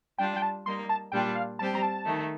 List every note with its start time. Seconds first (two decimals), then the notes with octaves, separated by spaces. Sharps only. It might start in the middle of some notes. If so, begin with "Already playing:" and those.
0.18 G3 D4 F4 G5
0.36 G5
0.42 A5
0.66 G3 A#3 D#4 C6
0.89 A5
1.12 A#2 G3 D4 F4 G5
1.35 F5
1.59 G3 C4 G4 A5
1.75 A#5
1.83 A5
2.06 D#3 A3 D#4